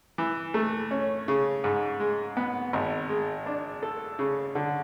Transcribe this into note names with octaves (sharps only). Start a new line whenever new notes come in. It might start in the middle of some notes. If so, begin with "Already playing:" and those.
E3
A3
C#4
C#3
G#2
G#3
B3
G#1
G#3
D4
A4
C#3
D3